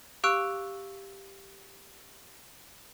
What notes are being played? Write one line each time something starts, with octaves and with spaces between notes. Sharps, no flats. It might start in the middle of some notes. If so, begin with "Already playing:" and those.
G4 F5 C#6 E6 F#6 D7